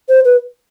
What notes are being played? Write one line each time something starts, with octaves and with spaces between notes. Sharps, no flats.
C5
B4